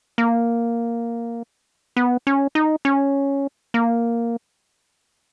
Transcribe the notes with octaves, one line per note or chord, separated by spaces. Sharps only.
A#3
B3
C#4
D#4
C#4
A#3